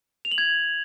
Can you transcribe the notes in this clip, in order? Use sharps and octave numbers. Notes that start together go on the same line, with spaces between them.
F7
F#7
G#6